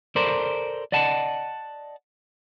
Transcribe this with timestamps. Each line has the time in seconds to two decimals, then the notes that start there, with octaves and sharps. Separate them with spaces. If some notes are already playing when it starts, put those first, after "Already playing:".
0.16 A4 A#4 C5 D5
0.92 D5 D#5 F#5 A5